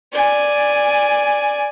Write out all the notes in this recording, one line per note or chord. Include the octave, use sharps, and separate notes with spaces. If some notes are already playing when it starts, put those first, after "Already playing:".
D5 G#5